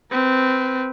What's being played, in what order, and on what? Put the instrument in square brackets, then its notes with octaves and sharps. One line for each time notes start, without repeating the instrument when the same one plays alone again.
[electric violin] C4 B4